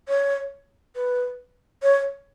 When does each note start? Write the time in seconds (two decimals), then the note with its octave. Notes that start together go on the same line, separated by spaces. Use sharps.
0.08 C#5
0.96 B4
1.83 C#5